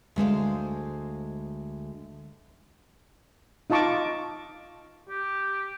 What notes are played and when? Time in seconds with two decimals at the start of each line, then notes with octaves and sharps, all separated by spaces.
0.16 D2 G#3 C5 F5
3.70 D#4 F4 D#5 A5 C#6 D6
5.09 G4